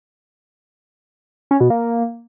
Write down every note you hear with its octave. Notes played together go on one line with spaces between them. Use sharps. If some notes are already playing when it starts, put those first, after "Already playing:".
C#4
B2
A#3